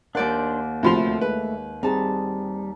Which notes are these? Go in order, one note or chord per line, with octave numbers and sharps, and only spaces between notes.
D#2 D4 A#4 C5 D5 F#5 G6
D2 C3 F3 A3 B5 C6 F7
G#3 B4
G3 C4 D#4 G#4 A5